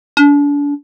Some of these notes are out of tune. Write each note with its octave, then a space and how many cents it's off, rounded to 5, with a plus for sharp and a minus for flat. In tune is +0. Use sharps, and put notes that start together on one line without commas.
D4 -35